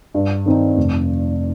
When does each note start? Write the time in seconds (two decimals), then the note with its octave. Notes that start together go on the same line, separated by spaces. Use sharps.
0.14 G2
0.46 D#3 C4 D#4
0.77 F1